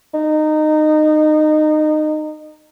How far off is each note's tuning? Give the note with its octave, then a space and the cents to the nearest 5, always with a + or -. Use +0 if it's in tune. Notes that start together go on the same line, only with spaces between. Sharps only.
D#4 -20